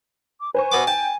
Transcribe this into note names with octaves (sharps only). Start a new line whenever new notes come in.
D6
B4 C5 G#5 C#6
B2 B3 D6
G5 A5